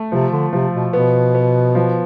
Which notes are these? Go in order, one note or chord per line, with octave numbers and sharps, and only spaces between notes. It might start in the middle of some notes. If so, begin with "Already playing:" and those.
Already playing: A3
C3 F3
D3
C3 F3
B2
B2 B3
B3
F3